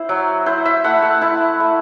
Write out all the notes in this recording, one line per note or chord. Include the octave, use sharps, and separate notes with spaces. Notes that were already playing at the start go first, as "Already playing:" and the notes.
Already playing: E4 C5
F#3
E4 C5
E5
A3 F#5
A5
E4 A5
A3